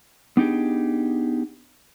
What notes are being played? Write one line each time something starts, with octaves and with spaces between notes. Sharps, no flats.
B3 D4 D#4 G4 G#4